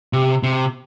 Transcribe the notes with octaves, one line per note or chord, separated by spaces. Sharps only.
C3
C3